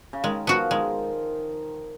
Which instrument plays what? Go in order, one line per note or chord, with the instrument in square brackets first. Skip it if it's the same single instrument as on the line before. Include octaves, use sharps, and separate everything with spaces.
[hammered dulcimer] C#3
[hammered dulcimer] D#3 [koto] G#3
[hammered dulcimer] F3 [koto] B3 F#4
[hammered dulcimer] D#3 [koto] G#3